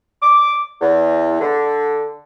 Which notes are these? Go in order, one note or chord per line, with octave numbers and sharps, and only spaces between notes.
D6
E2
D3